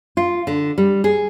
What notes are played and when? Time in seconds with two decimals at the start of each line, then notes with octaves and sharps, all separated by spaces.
0.17 F4
0.47 D3
0.78 G3
1.04 G#4